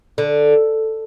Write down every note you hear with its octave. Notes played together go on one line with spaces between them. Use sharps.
D3